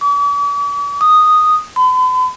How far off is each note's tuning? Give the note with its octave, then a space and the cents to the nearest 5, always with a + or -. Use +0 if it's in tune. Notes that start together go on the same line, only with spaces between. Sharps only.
D6 -45
D#6 -5
B5 +45